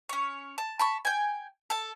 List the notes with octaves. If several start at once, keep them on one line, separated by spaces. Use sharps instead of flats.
C#4 C#5
A5
A5 B5 C#6
G5 G#5
A4 A5